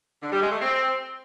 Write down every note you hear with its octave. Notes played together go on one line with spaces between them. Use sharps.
D3
G3
G#3
A3
C4